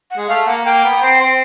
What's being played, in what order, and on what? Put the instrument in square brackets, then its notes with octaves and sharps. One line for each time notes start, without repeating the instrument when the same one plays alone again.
[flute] F#5
[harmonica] G#3
[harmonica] A3 [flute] F5
[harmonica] A#3 [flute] F#5
[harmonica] A#3 [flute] G5
[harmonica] B3
B3
C4
C4